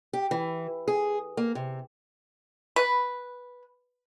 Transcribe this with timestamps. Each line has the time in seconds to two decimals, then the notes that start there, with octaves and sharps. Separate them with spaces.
0.13 G4
0.31 E3
0.88 G#4
1.37 A#3
1.55 C3
2.76 B4